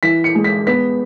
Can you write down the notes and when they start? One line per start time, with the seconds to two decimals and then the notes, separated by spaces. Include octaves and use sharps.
0.03 E3 B6
0.24 C#7
0.35 G#3
0.44 B6
0.67 B3 B6